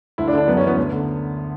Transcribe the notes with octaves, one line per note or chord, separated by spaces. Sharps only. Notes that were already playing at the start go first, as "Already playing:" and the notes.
D2 E4
D4
D3
D4
F#2 B3
C#4
E3 B3
D2 B3
D3